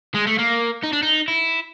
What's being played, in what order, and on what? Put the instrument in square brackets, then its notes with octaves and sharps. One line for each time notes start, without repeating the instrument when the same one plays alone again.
[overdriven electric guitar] G#3
A3
A#3
D#4
D4
D#4
E4